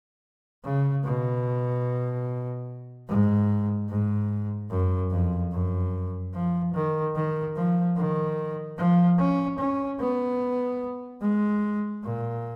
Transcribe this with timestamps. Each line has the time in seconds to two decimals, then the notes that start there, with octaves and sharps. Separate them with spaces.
0.64 C#3
1.05 B2
3.09 G#2
3.90 G#2
4.71 F#2
5.11 F2
5.52 F#2
6.34 F3
6.74 D#3
7.15 D#3
7.56 F3
7.97 D#3
8.78 F3
9.19 C#4
9.59 C#4
10.00 B3
11.21 G#3
12.03 A#2